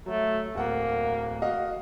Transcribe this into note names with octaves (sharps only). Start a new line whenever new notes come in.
F#3 A3
D1 A#3 F#5
F#4 D#5 F5